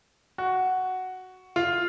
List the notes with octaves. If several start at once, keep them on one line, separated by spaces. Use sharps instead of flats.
F#4
F4